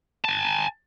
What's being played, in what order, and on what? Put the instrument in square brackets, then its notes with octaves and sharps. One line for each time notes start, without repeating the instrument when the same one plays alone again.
[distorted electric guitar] G#5 A5